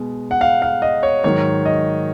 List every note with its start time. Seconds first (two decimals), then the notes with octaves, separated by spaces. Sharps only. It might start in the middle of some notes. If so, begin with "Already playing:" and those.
Already playing: B2 G#3
0.31 F#5
0.41 F5
0.62 F5
0.82 D#5
1.03 C#5
1.24 G#2 D#3 F#3 C#5
1.65 D#5